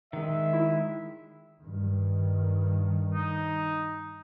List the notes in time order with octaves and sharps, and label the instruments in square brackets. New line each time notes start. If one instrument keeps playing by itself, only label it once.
[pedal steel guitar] D#3 G#3 [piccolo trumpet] E5
[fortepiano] E4
[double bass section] G2 D#3
[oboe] D#4